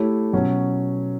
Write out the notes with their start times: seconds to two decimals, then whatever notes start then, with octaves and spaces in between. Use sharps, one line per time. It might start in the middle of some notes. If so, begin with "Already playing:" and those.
Already playing: A3 E4 G4 C#5
0.33 B2 F#3 C#4